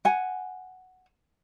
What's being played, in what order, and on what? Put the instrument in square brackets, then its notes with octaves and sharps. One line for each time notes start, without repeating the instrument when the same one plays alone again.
[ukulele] F#5 G#5